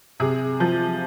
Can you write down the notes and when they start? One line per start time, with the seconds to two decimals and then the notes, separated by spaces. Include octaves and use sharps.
0.20 C3 G#4
0.60 F3